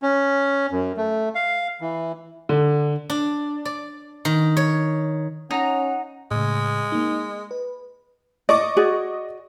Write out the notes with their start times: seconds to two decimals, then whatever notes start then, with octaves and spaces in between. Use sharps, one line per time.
0.03 C#4
0.71 F#2
0.97 A3
1.35 F5
1.81 E3
2.49 D3
3.10 D4
3.65 D5
4.25 D#3
4.57 C#5
5.51 C#4 D#4 F#5 A#5
6.31 A2 C#3 G#3
6.92 A#3 D#4
7.51 B4
8.49 D5 D#5 C#6 D6
8.77 F#4 G#4 D5